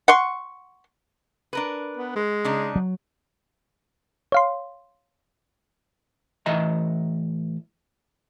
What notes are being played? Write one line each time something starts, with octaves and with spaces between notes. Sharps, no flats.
F#5 C6 C#6
D4 A#4 B4
B3
G#3
C#3 D4 D#4
F#3
C#5 F5 C6
A2 E3 D#5 E5 A#5